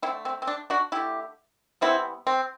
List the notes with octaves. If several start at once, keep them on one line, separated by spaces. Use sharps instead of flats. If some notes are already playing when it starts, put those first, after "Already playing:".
D3 A3 C4 E4
C4
C4
D4
D4 F#4
D3 A3 E4 G4
C3 E3 G3 B3 C4 E4
C4